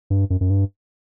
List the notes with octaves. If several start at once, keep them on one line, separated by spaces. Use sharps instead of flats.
G2
F#2
F#2
G2